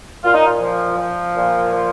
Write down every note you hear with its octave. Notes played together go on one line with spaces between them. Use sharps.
A#2 F4
D#4
F4
F3
F3
A#2
F3